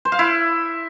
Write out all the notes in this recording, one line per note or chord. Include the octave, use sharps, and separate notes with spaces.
C5
F5
E4